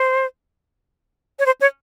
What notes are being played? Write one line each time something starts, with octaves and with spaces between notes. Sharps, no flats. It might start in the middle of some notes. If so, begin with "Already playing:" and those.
Already playing: C5
C#5
C5
C#5